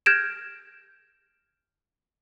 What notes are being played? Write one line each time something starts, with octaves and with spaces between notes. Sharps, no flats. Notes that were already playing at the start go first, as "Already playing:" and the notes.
F6 G6 G#6 A#6 D7 E7